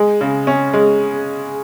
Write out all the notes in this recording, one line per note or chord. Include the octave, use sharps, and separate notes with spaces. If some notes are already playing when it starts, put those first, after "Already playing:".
Already playing: G#3
C#3
C#4
G#3